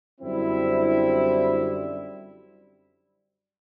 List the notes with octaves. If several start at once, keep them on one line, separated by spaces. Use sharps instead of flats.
F#2 D3 G3 C4 E4